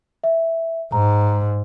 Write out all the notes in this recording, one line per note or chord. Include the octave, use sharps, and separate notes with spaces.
E5
G#2 A#5